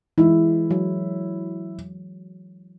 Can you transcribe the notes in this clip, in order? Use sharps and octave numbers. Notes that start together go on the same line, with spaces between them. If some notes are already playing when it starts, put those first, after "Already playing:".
E3 G#3 E4
F#3